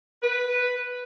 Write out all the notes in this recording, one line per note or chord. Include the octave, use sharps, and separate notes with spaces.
B4